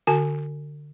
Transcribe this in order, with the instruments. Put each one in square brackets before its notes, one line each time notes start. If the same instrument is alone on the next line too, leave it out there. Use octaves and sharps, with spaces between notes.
[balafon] D3 F#4 G#5